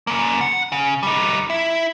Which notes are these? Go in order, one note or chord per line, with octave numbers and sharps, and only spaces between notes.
C#3 A#3
F#5
C#3
G3 D#4
E4